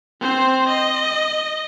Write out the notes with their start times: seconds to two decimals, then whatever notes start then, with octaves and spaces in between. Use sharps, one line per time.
0.21 C4 C5
0.69 D#5